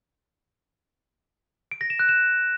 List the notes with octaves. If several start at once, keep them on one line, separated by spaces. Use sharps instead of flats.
D7
A#6
E7
F#6
E7